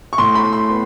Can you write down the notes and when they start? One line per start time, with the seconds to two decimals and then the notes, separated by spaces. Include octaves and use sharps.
0.13 C#6
0.18 A2 C6
0.35 B5
0.44 A2
0.53 C6
0.70 B3